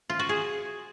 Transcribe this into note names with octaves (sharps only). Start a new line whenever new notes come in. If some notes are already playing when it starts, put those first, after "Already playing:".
F4
F#4
G#4